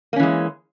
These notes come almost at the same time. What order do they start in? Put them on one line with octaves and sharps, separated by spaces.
A#3 C#4 E3 G#3